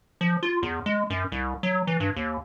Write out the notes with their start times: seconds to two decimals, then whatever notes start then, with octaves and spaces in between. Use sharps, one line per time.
0.21 F3
0.43 F4
0.63 E2
0.86 G#3
1.10 F#2
1.32 C2
1.63 F#3
1.87 E3
2.00 G2
2.16 D#2